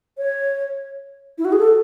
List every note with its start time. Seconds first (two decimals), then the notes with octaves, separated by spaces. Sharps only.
0.18 C#5
1.38 E4
1.45 F#4
1.52 G#4
1.59 A4